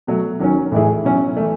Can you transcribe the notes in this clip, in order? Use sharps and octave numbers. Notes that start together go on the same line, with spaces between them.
B2 F#3 A3
D#3 F#3 C#4
A2 E3 A3 E4 G#4
B2 F#3 C#4 E4
E3 A3